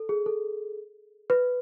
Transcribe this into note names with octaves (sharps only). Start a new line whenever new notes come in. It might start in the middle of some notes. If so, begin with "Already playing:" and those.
Already playing: A4
G#4
A4
B4